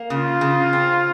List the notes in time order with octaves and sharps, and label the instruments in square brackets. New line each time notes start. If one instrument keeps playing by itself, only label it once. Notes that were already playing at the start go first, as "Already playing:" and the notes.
Already playing: [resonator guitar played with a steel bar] A#3
[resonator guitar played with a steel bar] C#3 [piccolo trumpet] F4
[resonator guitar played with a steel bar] C#3
C4